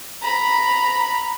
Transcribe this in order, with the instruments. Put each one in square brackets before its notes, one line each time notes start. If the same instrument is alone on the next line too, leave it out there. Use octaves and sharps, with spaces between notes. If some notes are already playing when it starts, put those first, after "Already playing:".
[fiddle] A#5 B5